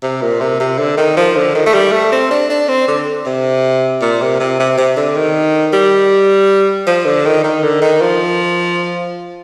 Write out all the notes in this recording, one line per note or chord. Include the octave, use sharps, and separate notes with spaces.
C3
A#2
C3
C3
D3
D#3
F3
D3
D#3
A3
G3
A3
C4
D4
D4
C4
D3
C3
A#2
C3
C3
C3
C3
D3
D#3
G3
F3
D3
D#3
D#3
D3
D#3
F3